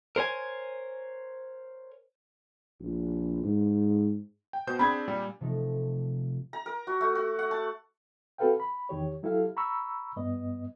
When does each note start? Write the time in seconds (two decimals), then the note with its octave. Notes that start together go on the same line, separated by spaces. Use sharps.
0.16 A#4 C5 C#5 G#5
2.80 A#1
3.44 G#2
4.53 G5
4.67 B2 C5 G6
4.79 C4 D4 G#4 B5 G#6
5.08 A#2 G3
5.41 C3 F3 A3 D#4
6.53 A#5
6.66 A#4
6.87 F#4
7.01 A3
7.15 F#4
7.39 F#5
7.51 A5
8.38 C4 F#4 A4 B4 F5 G5
8.60 B5
8.89 E2 D#3 G4 C#5
9.23 F#3 E4 G4 A4 F5
9.57 A#5 B5 C#6 E6
10.16 G2 B3 D#5